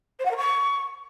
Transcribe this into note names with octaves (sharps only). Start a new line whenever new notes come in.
C5
F#5
A#4
C#6